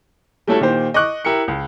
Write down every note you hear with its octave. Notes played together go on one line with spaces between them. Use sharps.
G3 A3 C#4 E4 F#4 A4
A#2 D#3 G4 C5
D#5 C#6 D6 F#6
E4 G4 A#4 C#7
C#2